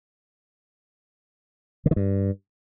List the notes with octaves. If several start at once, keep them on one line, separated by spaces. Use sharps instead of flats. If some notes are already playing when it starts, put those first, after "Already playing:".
D3
D#3
G2